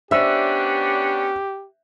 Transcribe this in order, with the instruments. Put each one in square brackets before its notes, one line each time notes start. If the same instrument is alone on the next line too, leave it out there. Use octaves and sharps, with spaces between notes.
[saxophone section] B3 C#4 D4 [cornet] G4 [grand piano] C5 E6 [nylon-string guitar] E5